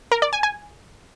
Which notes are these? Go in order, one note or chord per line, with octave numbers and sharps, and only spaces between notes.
A#4
D5
G#5
G#5